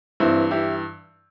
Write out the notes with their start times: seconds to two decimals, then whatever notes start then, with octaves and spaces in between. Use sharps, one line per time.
0.20 G2 E3 C4 E4
0.51 E4 G4